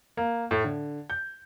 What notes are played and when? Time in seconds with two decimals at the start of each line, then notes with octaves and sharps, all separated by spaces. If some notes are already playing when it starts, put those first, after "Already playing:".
0.17 A#3
0.51 A2
0.64 D3
1.10 G6